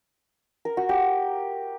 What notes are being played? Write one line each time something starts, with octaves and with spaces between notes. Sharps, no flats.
A#4
F#4
G4